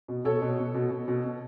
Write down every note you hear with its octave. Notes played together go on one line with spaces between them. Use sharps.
B2
B2 A4 C#5
B2
B2
B2
B2
B2
B2